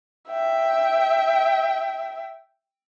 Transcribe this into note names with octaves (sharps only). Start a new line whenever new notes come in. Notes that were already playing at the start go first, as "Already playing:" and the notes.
E5 G5